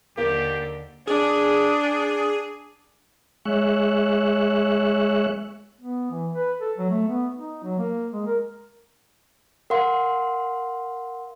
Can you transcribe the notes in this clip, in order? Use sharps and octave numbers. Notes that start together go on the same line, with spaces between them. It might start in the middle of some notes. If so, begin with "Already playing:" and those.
D#2 D3 A#3 G4
D4 G#4
G#3 C#5 E5 F#6
B3
E3
B4
A4
F#3
A3
B3
D#4
F#3
A#3
G#3
A#4
A#4 F5 F#5 C6